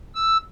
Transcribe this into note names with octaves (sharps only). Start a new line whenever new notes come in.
E6